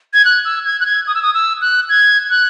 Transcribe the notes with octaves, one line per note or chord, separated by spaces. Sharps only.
G#6
F#6
E6
G#6
F#6
G#6
D#6
E6
D#6
E6
F#6
G#6
F#6